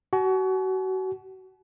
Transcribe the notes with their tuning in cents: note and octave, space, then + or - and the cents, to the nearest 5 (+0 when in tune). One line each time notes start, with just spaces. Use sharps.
F#4 +30 G#5 +45